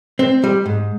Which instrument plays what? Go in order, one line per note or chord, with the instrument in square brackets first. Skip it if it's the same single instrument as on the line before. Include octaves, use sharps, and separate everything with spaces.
[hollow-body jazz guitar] C4
G3
G#2